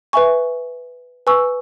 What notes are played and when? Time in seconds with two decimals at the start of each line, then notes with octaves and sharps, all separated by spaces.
0.13 B4 E5 G#5 C#6
1.27 B4 G#5 C#6 E6